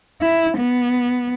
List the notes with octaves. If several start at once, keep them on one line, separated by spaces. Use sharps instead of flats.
E4
B3